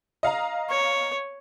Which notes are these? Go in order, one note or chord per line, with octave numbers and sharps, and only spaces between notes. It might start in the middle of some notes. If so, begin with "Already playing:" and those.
D#5 F5 A#5
C#5